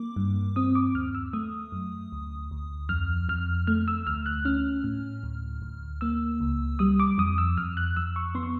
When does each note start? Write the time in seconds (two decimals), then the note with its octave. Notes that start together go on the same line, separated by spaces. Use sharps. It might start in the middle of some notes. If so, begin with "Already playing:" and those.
Already playing: A#3 D6
0.16 G2
0.56 C4 D#6
0.75 D6
0.95 D#2 F6
1.15 E6
1.33 A3 D#6
1.72 F#2
2.12 D2
2.51 D2
2.89 F2 F6
3.29 F2 F6
3.67 A3 F6
3.88 E6
4.07 D2 F6
4.26 F#6
4.45 C#4 F6
4.84 A2
5.23 D2
5.62 D2
6.01 A#3 E6
6.40 C#2
6.79 G3 D#6
7.00 D6
7.18 F2 D#6
7.38 E6
7.57 F2 F6
7.77 F#6
7.97 F2 E6
8.16 C#6
8.35 B3 C6
8.43 C#6